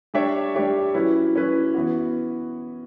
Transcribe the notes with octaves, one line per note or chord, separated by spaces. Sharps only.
G3 D4 G4 C#5 E5
G3 D4 G4 C#5 E5
F#3 C#4 E4 B4
F#3 C#4 E4 B4
E3 B3 F#4